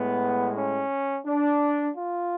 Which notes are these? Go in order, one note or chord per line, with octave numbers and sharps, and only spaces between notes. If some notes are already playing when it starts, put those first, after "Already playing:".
Already playing: A2 G#3 B3
C#4
D4
F4